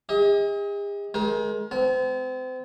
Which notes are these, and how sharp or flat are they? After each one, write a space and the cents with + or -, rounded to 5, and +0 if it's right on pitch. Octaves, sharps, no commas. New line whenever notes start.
G#4 -45 D#5 +30
G#3 +30 A#4 +35 G5 +0
C4 -35 A5 -40